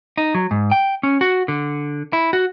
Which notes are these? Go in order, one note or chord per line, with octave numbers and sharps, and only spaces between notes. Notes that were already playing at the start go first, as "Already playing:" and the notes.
D#4
F#3
G#2
G5
C#4
F#4
D3
E4
F#4